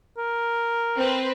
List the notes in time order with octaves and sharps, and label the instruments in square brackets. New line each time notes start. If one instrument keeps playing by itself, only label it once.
[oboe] A#4
[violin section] C4 B4